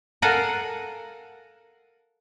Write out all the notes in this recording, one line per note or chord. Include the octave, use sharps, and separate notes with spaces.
A4 A#4 F5 F#5 G#5